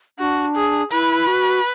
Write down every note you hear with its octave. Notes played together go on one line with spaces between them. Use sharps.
D4 F#4
G#4
E4 B4
F#4